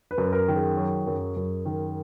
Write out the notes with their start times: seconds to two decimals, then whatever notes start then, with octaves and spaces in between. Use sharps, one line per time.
0.11 B4
0.18 F#2
0.33 A#4
0.48 D#3
0.56 G#4
0.77 F#3
1.07 F#2
1.36 F#2
1.66 D#3